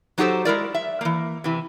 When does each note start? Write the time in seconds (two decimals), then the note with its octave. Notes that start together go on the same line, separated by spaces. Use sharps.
0.18 F#3 D#4 F#4 G4 A4 C5
0.45 G#3 E4 A#4 D5
0.75 E5
1.01 E3 A#3
1.44 C3 E3